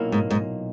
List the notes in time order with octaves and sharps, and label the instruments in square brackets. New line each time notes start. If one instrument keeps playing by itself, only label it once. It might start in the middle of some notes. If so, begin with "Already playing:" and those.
Already playing: [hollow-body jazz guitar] B1 A#2 A#3 E4
[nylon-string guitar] G#2
G#2